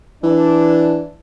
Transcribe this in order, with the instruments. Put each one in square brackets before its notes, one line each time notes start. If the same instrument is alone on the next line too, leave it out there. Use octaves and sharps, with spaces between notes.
[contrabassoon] E3 [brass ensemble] D4